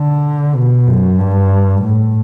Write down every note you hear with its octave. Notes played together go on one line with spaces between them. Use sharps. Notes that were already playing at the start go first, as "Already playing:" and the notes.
Already playing: D3
B2
F#2
G2
A2